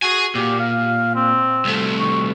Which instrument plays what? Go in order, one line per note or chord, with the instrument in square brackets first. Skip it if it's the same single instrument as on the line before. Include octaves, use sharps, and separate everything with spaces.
[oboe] F#4 [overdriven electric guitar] G#4 G#5
[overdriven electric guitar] A#2 [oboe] G4
[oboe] F5
C4
[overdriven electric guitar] C2 A3
[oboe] C#6